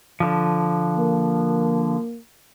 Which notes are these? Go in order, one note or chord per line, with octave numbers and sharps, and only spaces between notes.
D3 F3
A#3